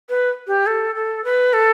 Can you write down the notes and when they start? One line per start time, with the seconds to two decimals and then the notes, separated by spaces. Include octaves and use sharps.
0.09 B4
0.47 G4
0.66 A4
0.95 A4
1.24 B4
1.53 A4